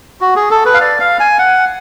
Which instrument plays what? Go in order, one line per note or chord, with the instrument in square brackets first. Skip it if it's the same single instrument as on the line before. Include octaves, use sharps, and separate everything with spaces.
[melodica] F#4
G#4
A4
B4
F5
D5
F5
G#5
F#5